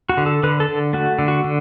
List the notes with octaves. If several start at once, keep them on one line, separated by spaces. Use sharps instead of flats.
F#4
D3
A4
D3 B4
A4
D3
A3 F#4
D3
F#4
D3